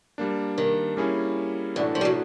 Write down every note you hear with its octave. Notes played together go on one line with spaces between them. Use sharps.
G3 A#3 D4
D#3
G3 A#3 C#4 E4 G#4
A2 D3 E3 A3 D4 F#4
F3
G3
F#3